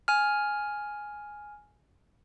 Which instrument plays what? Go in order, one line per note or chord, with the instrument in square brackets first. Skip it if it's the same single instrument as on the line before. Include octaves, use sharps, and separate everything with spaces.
[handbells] G#5 F6